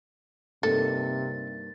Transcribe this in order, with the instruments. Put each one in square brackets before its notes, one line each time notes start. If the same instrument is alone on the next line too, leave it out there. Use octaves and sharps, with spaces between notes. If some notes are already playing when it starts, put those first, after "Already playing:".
[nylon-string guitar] G2 A#3 D#4 [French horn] C3 [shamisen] A4 [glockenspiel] A6